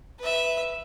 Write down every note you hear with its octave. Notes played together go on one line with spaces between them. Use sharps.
B4 E5